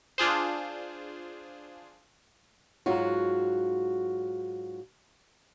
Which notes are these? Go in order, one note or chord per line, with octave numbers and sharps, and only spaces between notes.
D4 F4 G#4 C5
G#2 F#3 F4 F#4